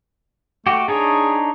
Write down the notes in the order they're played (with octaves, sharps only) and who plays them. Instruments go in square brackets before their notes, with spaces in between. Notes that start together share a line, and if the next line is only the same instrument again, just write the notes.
[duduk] A3 [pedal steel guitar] F#4 G4
[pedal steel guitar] D4 D#4 C#5 [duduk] G#4